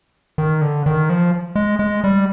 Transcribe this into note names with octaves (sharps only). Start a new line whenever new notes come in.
D#3
D3
D#3
F3
G#3
G#3
G3